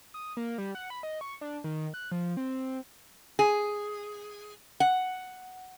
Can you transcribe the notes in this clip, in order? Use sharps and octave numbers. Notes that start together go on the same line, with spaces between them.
D#6
A#3
G3
F#5
B5
D#5
C#6
D4
D#3
F#6
F3
C4
G#4
F#5